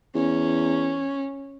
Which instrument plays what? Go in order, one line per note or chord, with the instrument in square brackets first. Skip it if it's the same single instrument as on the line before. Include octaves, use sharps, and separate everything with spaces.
[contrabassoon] E2 [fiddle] C#4